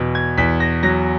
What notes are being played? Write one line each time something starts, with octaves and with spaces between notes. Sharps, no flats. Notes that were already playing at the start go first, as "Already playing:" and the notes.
Already playing: E2 B2
G#6
E2 B6
A#6
F#3 A#6